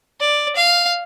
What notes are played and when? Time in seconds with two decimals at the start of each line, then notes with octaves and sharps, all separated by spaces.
0.20 D5
0.56 F5